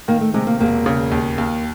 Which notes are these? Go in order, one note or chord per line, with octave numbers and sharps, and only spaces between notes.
D#3 A#3
A3
C3 G#3
A#3
E1 A#3
C#3
D#2
D#2